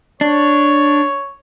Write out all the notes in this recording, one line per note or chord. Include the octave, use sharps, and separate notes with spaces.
D4 C#5